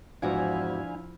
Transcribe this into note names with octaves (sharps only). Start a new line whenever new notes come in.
E2 G#2 F3 D4 E4 F#4 F5 G#5